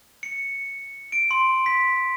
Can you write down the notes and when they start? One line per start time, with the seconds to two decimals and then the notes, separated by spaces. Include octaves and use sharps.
0.23 C#7
1.12 D7
1.31 C6
1.66 B6